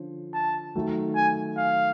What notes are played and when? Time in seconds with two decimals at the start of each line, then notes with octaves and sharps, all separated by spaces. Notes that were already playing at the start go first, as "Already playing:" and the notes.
Already playing: D3 F3 C#4
0.33 A5
0.75 D#3 F#3 A3
1.16 G#5
1.57 F5